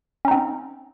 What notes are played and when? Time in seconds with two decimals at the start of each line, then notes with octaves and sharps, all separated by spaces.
0.25 C#4
0.28 D#4
0.31 C4